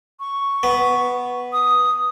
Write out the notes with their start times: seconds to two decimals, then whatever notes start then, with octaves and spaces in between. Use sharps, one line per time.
0.20 C#6
0.63 B3
1.52 D#6